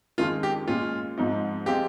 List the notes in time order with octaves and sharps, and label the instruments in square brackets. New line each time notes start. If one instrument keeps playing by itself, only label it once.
[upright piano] F2 D#3 G#3 C#4 [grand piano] F4
[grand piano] G4
[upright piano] A#2 G#3 C#4 [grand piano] F4
[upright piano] G#2 F3 C4 D#4
[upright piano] F3 G#3 C4 F4 [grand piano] G4